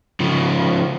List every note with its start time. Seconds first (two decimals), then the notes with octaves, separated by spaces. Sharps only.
0.20 C#3 F3